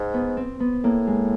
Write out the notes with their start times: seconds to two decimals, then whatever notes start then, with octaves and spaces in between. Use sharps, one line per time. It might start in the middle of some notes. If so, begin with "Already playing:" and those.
Already playing: G#2
0.14 B3
0.37 C4
0.60 B3
0.84 A2 A#3
1.07 G#3